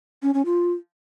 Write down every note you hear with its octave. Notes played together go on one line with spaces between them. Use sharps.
C#4
C#4
F4